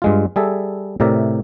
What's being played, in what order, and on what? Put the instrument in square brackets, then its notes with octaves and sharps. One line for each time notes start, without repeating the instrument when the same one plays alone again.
[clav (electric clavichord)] G2 G#3 F4
G3 G#4 A4 E5
A2 C3 A#4 D5 E5